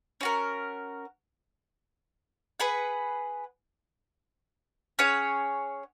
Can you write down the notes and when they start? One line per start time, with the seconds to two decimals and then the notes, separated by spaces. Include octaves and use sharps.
0.21 C#4 F#4 A#4
2.60 G#4 B4 F#5
4.99 C#4 G#4 C#5 F#5